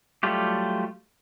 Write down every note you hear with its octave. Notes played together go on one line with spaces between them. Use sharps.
F#3 G3 A3 F4 G4